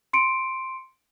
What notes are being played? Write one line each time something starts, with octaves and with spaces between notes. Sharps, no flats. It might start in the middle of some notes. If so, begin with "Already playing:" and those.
C6 C#7 D7